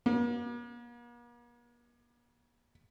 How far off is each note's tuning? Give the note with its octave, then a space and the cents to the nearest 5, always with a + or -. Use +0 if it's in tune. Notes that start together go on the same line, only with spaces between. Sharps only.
A#3 +45